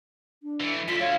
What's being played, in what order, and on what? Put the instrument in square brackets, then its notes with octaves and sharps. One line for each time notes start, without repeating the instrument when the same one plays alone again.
[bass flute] D4
[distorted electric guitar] E3 A3
[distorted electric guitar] D2 D3 [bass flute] F4 [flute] B6
[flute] C#5 [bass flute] F5